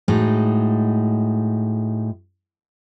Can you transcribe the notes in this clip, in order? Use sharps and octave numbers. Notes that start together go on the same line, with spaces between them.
A2 G#3 D#4 F#4